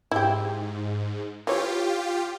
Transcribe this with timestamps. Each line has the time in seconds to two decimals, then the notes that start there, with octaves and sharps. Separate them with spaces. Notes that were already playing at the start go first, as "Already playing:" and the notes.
0.11 G#2 E4 G4
1.47 E3 F4 G4 C#5